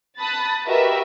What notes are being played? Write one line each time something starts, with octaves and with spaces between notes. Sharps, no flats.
A5 B5 D#6 F#6 A6
F#4 G4 A#4 B4 D#5 E5